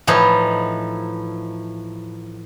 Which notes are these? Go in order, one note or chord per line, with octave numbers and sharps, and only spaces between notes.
A2 E3 F3 D#4